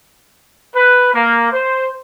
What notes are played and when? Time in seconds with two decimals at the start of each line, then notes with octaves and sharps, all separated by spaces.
0.75 B4
1.14 A#3
1.52 C5